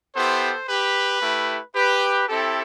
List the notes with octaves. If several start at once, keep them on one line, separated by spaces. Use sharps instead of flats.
B3 E4 G4 A4 C5
G4 B4
A3 E4 G4
G4 B4
C4 E4 G4 A4